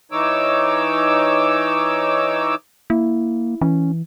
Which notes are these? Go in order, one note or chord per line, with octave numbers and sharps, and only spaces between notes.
E3 D#4 C#5 D6 E6
A#3 E4
E3 C#4